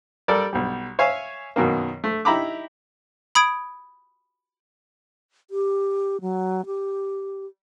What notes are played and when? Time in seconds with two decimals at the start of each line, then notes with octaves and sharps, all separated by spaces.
0.28 G3 A4 A#4 D5
0.53 B1 G3
0.99 C#5 E5 F5 G#5
1.56 F#2 B2 D#3 A#3
2.04 A3
2.25 D#4 E4 G4 A#5 B5 D6
3.35 B5 D#6 G#6 D7
5.51 G4
6.21 F#3
6.66 G4